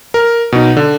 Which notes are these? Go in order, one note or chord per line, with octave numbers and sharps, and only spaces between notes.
A#4
B2 D#4
D3